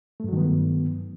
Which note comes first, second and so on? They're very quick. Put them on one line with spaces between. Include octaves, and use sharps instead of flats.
A3 G2 F#3 D#3 B3